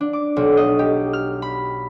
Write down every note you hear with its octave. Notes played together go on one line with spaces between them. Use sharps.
D4
D6
B1
D#5
G4
F6
B5